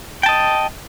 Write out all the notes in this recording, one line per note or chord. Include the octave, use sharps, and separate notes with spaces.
D#5 G5 A5